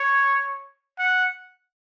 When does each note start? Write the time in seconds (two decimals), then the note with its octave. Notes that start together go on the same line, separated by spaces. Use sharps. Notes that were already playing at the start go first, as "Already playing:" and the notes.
Already playing: C#5
0.99 F#5